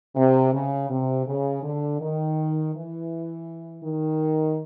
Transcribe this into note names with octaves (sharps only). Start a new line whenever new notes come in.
C3
C#3
C3
C#3
D3
D#3
E3
D#3